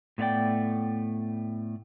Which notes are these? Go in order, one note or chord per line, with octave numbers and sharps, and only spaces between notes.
A2 A3 B3 C#5 D5 G5